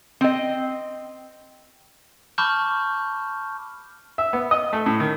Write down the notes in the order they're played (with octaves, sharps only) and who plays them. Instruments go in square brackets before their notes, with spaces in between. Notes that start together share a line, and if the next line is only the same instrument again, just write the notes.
[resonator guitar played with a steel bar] C4 D#5
[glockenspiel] A5 B5 C#6 D6 F6 G6
[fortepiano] E5
B3
D#5
A3
A2
D#3